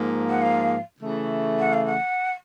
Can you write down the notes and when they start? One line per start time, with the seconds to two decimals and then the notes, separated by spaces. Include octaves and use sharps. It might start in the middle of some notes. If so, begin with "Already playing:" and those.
Already playing: G#2 F3 A#3
0.29 F#5
0.42 F5
1.00 C#3 E3 A3
1.59 F#5
1.73 F5
1.85 F#5